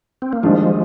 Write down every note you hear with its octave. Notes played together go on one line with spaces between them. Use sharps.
C4
A#3
D#2 D#3 F3 G3 G#3 D4 F4